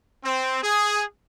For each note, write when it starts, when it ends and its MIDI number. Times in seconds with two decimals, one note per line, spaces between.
0.24 0.60 60
0.63 1.04 68